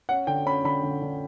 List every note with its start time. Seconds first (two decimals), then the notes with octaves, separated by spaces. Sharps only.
0.09 C#4 F#5
0.27 D3 G5
0.46 C#4 B5
0.64 D3 B5
0.83 D3
1.02 D3